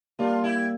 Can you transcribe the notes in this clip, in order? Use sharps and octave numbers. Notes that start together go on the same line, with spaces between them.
G3 A#3 D4 F4
E4 G4